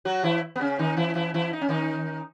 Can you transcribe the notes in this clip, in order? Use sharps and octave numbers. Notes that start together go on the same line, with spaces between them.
F#3 F#4
E3 E4
B3
C#3 C#4
D#3 D#4
E3 E4
E3 E4
E3 E4
D#4
C#4
D#3 D#4